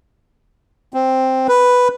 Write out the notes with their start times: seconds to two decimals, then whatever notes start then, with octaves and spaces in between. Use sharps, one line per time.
0.94 C4
1.48 B4